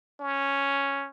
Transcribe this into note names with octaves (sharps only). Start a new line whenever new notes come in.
C#4